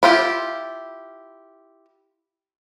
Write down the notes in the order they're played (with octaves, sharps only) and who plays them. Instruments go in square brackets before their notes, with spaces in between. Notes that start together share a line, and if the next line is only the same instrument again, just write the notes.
[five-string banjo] E4 F4 G4